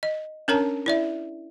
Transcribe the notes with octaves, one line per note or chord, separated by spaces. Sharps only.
D#5
C#4 D4 A#4 C#5 A5 A#5
E4 D5 E5